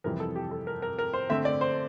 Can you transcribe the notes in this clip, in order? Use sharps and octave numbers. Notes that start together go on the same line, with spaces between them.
F2 C3 E3 G3 A#4
A4
G4
A4
A#4
A#4
A#4
C5
D3 A3 C4 E5
D5
C5